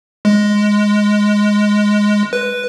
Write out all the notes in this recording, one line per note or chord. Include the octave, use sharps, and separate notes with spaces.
G#3
B4